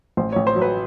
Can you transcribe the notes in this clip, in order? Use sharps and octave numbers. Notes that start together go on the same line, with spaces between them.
A1 C5
A1 C#5
C5
F#3
B4